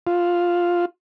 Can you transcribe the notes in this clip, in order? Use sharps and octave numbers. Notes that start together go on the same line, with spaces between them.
F4